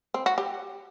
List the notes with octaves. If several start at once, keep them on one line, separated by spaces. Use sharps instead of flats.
C4
F#4
G4